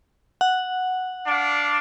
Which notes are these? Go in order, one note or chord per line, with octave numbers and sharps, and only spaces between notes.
F#5
D4 D5 F5